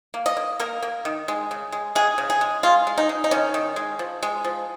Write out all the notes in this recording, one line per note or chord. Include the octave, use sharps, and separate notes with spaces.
A#3
D#5
A#3
A#3 A#4
A#3
D#3
G#3
C#3
G#3
G#3 G#4
C#3
G#4
G#3
G#3 F4
G#3
D#4
G#3
D#4
D#3 C#4
D#3
G#3
F3
G#3
F3